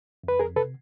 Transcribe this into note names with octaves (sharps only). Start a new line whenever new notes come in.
F2 B4
F2 G#4 A#4
C3 A4 B4